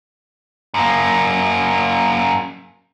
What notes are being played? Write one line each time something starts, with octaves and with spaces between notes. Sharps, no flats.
F#2 A#3